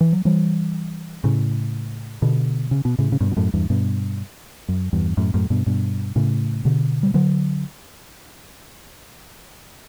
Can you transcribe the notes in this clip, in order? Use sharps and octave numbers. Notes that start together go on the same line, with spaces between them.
E3
F#3
E3 G3
A2 C#3
B2 D3
C#3
B2
A2 C#3
C#3
G2 B2
B2
F#2 A2
E2 G2
G2 B2
F#2
E2 G2
F#2 A2
F#2 A2
G2 B2
G2 B2
A2 C#3
B2 D3
G3
D3 F#3